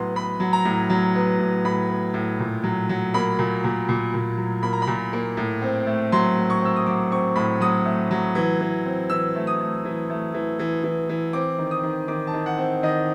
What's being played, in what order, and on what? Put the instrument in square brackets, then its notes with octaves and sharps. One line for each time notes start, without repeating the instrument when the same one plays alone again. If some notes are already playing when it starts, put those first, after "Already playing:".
Already playing: [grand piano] A2 F#3 B3 C6
B3 B5
F#3
A#5
A2
F#3
B3
A2
A2 B5
B3
A2
A#2
F#3
F#3
A#3 B5
A#2
A#2
A#2
A#2
F#3
A#3 B5
A#5
B5
A#2
A#3
A2
C4
A3
F#3 C6
A2
C#6
C4 E6
D#6
F#3 D6
C4 C#6
A2 B5
F#3 D#6
A3
F#3
E3
E3
C4
E3 E6
A3
D#6
A3
E3
A3
E3
E3
E3
E3
C4 D6
D#3
D#6
D#3
D#3 D6
A5
D#3
F#5
C4
D#3 D#5